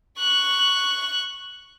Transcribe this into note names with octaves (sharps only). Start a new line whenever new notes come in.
C#6 F#6